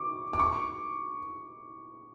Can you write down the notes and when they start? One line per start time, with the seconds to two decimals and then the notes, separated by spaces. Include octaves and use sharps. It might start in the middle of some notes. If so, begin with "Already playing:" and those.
Already playing: C#6 D6
0.33 D6
0.39 C#6